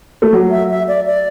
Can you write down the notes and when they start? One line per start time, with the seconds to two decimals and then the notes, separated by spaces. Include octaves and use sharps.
0.22 A3
0.33 F#3
0.51 E5
0.70 E5
0.88 D5
1.06 D5